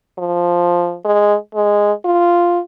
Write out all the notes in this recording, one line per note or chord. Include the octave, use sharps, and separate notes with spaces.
F3
G#3
G#3
F4